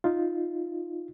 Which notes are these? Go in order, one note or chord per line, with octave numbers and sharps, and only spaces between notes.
D#4 F4